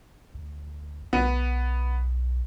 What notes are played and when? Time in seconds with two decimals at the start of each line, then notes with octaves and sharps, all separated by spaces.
0.35 D2
1.13 B1 B3